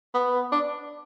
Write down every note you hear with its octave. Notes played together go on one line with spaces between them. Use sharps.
B3
D4